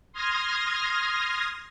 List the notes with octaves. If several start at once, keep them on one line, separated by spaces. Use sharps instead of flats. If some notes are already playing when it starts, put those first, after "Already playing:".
C6 D#6 F6 G#6 A#6